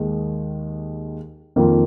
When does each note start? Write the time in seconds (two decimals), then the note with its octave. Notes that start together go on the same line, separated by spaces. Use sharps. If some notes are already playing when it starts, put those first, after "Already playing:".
Already playing: D#2 D#3 G#3
1.56 F2 D#3 A#3 F4